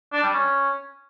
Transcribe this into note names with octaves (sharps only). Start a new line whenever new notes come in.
D4
G3
C#4